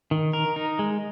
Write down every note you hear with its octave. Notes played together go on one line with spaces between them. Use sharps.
D#3
A#4
D#4
G#3